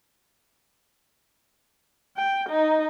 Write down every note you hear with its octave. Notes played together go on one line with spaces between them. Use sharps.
G5
D#4